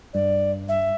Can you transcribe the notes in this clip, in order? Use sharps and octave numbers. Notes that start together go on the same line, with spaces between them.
G2 D5
E5